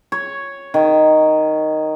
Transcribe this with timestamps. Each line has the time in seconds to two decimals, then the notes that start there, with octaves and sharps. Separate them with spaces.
0.12 C#5
0.74 D#3